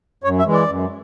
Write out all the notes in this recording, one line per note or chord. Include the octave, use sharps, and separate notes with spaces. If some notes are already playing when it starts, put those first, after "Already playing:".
F#2 C#5
E5
E3 G#3
D5
F#2